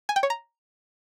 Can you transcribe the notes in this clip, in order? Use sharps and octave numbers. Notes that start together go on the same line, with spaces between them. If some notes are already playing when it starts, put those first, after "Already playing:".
G#5
G5
C#5
A#5